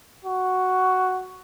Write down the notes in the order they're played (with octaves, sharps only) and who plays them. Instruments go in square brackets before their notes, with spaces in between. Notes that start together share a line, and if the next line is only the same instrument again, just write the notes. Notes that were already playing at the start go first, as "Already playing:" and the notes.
[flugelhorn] F#4